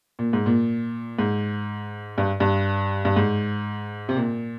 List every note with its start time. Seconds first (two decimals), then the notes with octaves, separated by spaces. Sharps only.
0.19 A#2
0.33 G#2
0.46 A#2
1.19 G#2
2.18 G2
2.40 G2
3.05 G2
3.16 G#2
4.09 C3
4.16 A#2